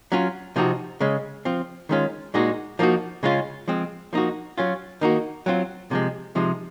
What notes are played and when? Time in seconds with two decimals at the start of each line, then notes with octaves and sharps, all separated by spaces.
0.12 F#3 C#4 F4
0.56 C3 F3 C4 D#4 F#4
1.00 C#3 G#3 C#4
1.45 F3 C4 F4
1.89 D#3 G#3 C#4 F4
2.34 A#2 G#3 D#4 F#4
2.79 F3 A#3 D#4 F#4
3.23 C#3 G#3 C#4 F4
3.68 F3 G#3 C4
4.13 F3 A#3 D#4 F#4
4.58 F#3 C#4 F4
5.01 D#3 A#3 D#4 F#4
5.46 F#3 C4 F4
5.91 C3 F3 G#3
6.35 C3 F3 G#3 D#4